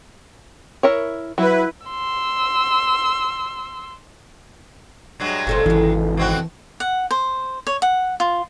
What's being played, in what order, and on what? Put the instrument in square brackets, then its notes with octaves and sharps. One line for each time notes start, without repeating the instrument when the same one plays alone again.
[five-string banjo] E4 A#4 C#5
[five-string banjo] F#3 [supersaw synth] E4 B4
[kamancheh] C6 E6
[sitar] G2 F#3 G#3
[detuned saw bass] F#1 [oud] A#2 A4 C5
[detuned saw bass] G#1 [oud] F2 C#3 [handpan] E3
[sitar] B2 C4 F#4
[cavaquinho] F#5
C5
C#5
F#5
F4